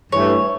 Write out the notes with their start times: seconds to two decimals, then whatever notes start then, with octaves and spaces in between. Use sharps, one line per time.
0.12 G2 E3 A3 C#5